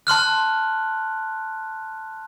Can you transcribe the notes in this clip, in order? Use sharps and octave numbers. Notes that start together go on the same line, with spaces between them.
A5 C6 F6 F#6